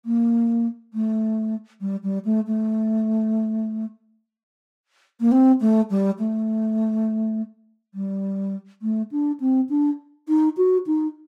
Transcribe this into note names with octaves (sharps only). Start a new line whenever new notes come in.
A#3
A3
G3
G3
A3
A3
A#3
C4
A3
G3
A3
G3
A3
D4
C4
D4
D#4
F#4
D#4